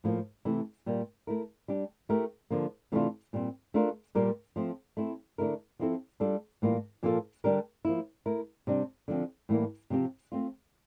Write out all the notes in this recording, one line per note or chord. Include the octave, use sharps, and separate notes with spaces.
A2 F3 A#3
C3 E3 A3 E4
A#2 G3 A#3
A3 E4 A#4
G3 D4 G4
A3 E4 G4 A#4
D3 F3 A#3
C3 E3 A3 D4 F4
A#2 G3 C4
A3 D4 F4 A#4
A#2 G3 A#3 F4 A#4
F3 A3 C4
A3 C4 E4
D3 A3 E4 A#4
F3 C4 E4 A4
G3 D4 F4 A4
A2 E3 G3 A#3 F4
A#2 F3 A#3 F4 A4
D3 G3 D4 G4 A#4
F3 A#3 E4
A3 E4 A#4
C3 G3 D4
D3 F3 C4
A2 E3 G3 A#3 E4
C3 F3 C4 G4
A3 C4 F4